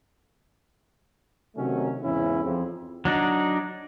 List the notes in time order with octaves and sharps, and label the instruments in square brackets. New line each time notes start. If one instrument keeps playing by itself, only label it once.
[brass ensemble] C3 D#3 F#3 A3 C#4
E2 G#2 C#3 C#4 E4
F2
[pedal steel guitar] F#3 D4 D#4 D5